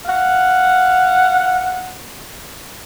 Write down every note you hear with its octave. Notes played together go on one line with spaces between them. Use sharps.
F5 F#5